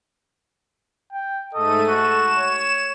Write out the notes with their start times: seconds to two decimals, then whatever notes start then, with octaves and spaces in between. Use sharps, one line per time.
1.13 G5
1.54 G#2 A3 A4 D#5 D#7
1.88 F#4 E7
2.38 C#5